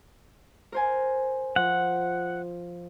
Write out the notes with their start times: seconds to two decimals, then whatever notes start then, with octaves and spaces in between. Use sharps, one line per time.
0.72 A#4 C5 G#5
1.56 F3 F#5